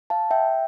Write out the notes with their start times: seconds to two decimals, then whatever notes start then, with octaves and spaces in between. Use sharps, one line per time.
0.10 F5 A5
0.31 E5 G5